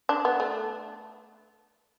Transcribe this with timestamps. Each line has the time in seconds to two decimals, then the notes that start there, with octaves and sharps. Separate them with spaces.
0.09 D4
0.25 B3
0.40 A3